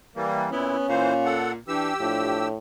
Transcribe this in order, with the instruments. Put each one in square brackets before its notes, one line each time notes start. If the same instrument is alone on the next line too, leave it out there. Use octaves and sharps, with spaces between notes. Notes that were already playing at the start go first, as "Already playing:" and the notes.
[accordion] E3 G3 A#3
[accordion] A#2 E4 [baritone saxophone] B3 [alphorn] C#4
[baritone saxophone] A#2 [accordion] E3 C5 [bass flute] F5
[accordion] A4 F#5
[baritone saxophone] E3 [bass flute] D4 [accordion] G4 E6
[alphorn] A2 [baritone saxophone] F3 [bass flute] D4